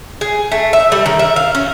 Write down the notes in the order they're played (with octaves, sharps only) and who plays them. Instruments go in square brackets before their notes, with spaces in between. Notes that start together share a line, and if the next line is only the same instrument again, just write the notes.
[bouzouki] G#4
A3
E5
G3
D#3
E5
F5
C#4